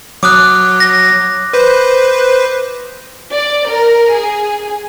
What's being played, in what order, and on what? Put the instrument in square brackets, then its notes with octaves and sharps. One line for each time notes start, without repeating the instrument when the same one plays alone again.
[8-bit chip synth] F#3 [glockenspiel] D6 D#6 F#6
[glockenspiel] A#6
[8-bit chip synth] B4 C5
[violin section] D5
A#4
G#4